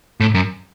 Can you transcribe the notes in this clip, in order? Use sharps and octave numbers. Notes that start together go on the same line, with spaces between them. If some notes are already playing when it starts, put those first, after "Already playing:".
A2
F#2